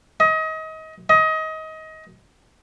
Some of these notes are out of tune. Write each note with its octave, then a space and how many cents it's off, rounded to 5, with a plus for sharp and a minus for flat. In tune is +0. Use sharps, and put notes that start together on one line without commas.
D#5 +30
D#5 +25